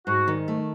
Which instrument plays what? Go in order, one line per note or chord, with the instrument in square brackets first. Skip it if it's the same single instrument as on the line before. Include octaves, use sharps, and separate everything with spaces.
[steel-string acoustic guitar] G#2 [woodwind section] F#4
[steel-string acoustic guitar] D#3
A3